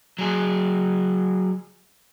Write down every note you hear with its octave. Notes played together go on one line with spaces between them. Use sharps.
F#3 G#4